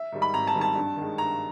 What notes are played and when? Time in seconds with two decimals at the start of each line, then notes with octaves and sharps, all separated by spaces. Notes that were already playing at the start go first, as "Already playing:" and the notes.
Already playing: E5
0.12 G#2 D#3 G3
0.22 B5
0.34 G#1 A#5
0.47 A5
0.54 G#2 D#3 G3
0.61 A5
0.76 G2
0.97 D#3 G#3
1.18 G2 A#5